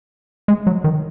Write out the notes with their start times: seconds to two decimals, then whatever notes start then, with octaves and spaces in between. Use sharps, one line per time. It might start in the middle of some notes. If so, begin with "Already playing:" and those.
0.48 G#3
0.67 F#3
0.84 D#3